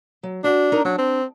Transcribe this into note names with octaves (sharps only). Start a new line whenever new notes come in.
F#3
D4 F#4 F#5
D#4 A#4
F#3 D4
C4